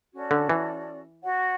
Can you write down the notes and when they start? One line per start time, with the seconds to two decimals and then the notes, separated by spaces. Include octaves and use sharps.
0.12 C#4 F#4 A4 D5
0.31 D3
0.49 E3
1.23 F#4 C#5 F#5